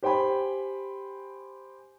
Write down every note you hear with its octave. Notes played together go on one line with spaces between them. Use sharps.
G4 C5 G5 G#5 B5